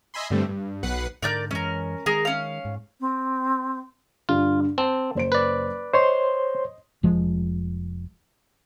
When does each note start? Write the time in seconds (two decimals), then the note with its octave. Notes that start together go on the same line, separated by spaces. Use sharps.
0.14 D#5 E5 G#5 B5 C6
0.30 G2 D3 G3 A3 C4
0.49 G2
0.83 B1 B4 F#5 F#6 C7
1.23 G#2 D3 A#4 D5 G6
1.51 F#2 E3 G#3 C#4 A#4
2.06 D#3 G#3 G#4 A#4
2.25 C#4 F5
2.65 G#2
3.00 C4
4.29 G2 D3 F4
4.78 C4 A5
5.15 F#1 C5 D7
5.32 B4 D5
5.94 C5 C#5 D#5 C6
7.03 F1 F3 G#3